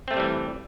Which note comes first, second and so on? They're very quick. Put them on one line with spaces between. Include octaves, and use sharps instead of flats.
C4 A3 C3 G3 E3